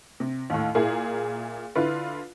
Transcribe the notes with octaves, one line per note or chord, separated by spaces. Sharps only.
C3
D#2 A2
A#2 E4 G#4 A#4
D3 E4 F4 B4